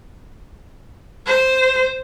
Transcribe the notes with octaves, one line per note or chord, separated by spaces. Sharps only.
C5